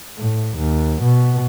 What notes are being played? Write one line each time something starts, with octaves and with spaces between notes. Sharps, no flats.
A2
D#2
B2